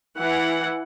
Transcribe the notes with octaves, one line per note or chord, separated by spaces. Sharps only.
E3 F#5